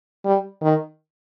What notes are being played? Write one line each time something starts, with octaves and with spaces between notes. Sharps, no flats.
G3
D#3